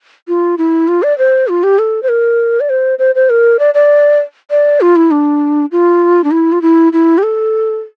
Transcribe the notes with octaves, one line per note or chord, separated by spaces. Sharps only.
F4
E4
F4
D5
C5
F4
G4
A4
C5
A#4
D5
C5
C5
C5
A#4
D5
D5
D5
F4
E4
D4
F4
D4
E4
F4
E4
E4
G4
A4